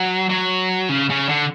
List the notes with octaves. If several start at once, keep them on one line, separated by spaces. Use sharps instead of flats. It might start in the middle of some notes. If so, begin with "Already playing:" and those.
Already playing: F#3
F#3
C#3
C#3
D3